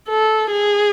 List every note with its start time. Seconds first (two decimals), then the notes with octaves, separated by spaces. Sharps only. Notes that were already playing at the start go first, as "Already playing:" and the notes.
0.09 A4
0.51 G#4